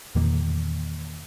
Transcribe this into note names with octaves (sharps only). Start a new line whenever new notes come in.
E2 A#2 D#3 A#3